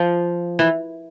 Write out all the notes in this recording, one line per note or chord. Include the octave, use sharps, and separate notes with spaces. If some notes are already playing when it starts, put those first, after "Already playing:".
Already playing: F3
E3